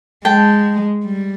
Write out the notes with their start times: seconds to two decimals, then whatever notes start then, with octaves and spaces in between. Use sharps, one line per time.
0.25 G#3 G5 A5
1.05 G3